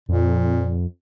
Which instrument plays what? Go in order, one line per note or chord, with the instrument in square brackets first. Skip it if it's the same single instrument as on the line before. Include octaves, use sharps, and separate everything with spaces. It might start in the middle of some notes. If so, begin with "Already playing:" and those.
[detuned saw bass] F2 [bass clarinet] A#2